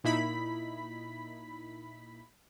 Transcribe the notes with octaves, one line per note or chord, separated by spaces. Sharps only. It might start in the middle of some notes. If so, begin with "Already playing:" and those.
A#2 D#4 E4 B5 B6